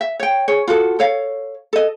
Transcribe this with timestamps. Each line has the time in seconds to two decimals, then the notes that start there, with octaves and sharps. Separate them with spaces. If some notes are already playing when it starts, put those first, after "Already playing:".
0.01 E5
0.20 C#5 G5
0.48 G#4 C#5
0.68 F4 F#4 A4
0.99 A4 C#5 F5
1.73 A4 D#5